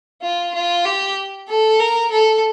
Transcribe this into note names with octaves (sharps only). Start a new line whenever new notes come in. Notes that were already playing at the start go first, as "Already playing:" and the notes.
F4
F4
G4
A4
A#4
A4